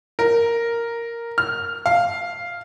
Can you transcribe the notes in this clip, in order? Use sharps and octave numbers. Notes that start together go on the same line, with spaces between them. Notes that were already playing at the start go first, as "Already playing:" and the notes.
A#4
F6
F5